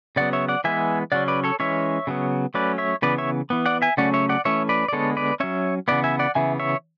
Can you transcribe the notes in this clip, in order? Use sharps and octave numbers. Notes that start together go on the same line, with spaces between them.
C#3 F#3 B3 D5 F#5
C#5 E5
D5 F#5
E3 G#3 B3 E5 G#5
C#3 F#3 C#4 D5 F#5
B4 D5
A4 C#5
E3 G#3 C#4 C#5 E5
C#3 F#3 B3
F#3 A3 C#4 B4 D5
C#5 E5
C#3 E3 B3 B4 D5
C#5 E5
E3 B3
D5 F#5
E5 G#5
C#3 F#3 A3 C#4 D5 F#5
C#5 E5
D5 F#5
E3 A3 C#4 C#5 E5
B4 D5
D5
D3 G#3 B3 A4 C#5
B4 D5
F#3 C#4 C#5 E5
C#3 E3 B3 D5 F#5
E5 G#5
D5 F#5
C#3 E3 B3 E5 G#5
C#5 E5